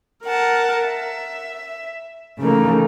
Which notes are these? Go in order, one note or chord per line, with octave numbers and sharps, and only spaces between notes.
A#4 F#5 A5
E5
C#3 E3 A3 A#3 D#4